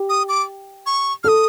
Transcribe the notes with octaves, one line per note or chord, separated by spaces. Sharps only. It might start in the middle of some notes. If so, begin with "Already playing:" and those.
Already playing: G4
D#6
D6
C#6
A4 D#6 F6